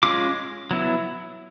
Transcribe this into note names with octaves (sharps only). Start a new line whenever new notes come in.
G#3 C#4 F4 D6
F#3 B3 E4